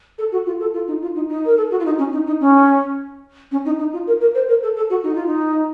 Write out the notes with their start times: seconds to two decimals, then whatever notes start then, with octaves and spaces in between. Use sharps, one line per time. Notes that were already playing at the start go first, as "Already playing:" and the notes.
0.18 A4
0.32 F#4
0.46 F4
0.60 A4
0.74 F4
0.88 D#4
1.02 F4
1.16 D#4
1.29 D#4
1.45 A#4
1.57 A4
1.71 F#4
1.79 F4
1.85 D#4
1.98 C#4
2.12 D#4
2.26 D#4
2.40 C#4
3.52 C#4
3.65 D#4
3.79 D#4
3.93 F4
4.07 A#4
4.21 A#4
4.35 C5
4.48 A#4
4.63 A4
4.76 A4
4.90 F#4
5.04 D#4
5.15 F4
5.26 D#4